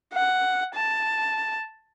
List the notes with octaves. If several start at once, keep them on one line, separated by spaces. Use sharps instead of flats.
F#5
A5